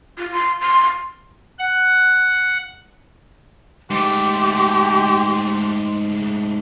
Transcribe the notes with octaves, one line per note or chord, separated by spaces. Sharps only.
F4
C6
C6
F#5
G#2 A3 G4 C6